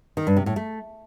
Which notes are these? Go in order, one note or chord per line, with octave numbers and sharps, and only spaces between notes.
D#3
G2
C3
A2
A3